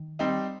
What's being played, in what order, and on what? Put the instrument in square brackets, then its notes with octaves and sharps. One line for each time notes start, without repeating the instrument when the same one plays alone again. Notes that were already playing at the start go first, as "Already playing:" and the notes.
Already playing: [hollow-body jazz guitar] D#3
[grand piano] G3 C4 D#4